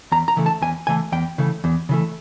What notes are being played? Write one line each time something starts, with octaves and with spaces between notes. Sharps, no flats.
E2 A#5
A#5
C#3 E3 A3
A5
E2 G#5
C#3 E3 A3 G#5
E2 G5
C#3 E3 A3
E2
C#3 E3 A3